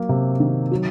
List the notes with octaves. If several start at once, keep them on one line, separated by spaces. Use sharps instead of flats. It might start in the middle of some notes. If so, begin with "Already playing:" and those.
Already playing: F#3 A#3
C3
D#3
F#3